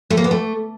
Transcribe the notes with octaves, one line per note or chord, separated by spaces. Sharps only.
A3
A#3
B3
A3